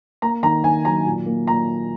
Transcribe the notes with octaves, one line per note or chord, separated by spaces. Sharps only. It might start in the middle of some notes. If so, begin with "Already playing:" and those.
A#3 A#5
D#3 A#5
D#3 G#5
F#3 A#5
A#2
A#3
A#2 A#5